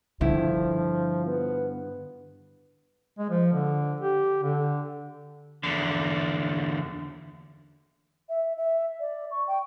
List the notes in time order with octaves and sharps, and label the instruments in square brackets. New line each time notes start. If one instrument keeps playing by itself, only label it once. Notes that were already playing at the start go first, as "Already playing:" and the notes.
[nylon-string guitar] G2 E4 G4 [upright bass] D3 [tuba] F3
[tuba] B3
[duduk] G#3
F3
D3
G4
D3
[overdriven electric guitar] E2 D3
[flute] E5
E5
D5
C#6
G5